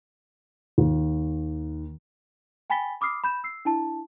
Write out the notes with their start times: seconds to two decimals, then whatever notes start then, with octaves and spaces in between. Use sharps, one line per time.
0.78 D#2
2.70 G5 G#5 B5 A6 B6 G7
3.01 B5 D6 D#6 F6 C7
3.24 B5 G6 E7
3.44 E6 C7
3.65 D4 E4 A5